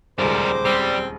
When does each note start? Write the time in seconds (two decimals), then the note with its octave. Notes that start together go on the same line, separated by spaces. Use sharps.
0.18 D#1 C#2 G3 A#4 C5 D6
0.65 G3 C4